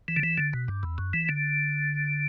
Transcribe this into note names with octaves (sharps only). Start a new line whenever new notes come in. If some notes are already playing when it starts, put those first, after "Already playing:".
E3
D3
E3
D3
B2
G2
E2
F#2
E3
D3